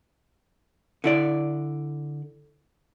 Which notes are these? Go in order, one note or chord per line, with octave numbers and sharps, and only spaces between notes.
D3 E4 D5